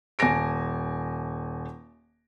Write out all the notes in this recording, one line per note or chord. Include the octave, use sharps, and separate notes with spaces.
D#1 G#5 A5 A#6 D7